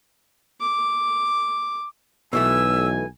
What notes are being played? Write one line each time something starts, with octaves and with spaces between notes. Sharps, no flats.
D6
B1 B2 E3 A3 G#5 E6